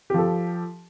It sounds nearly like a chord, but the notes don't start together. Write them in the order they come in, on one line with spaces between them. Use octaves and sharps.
G4 F3 A4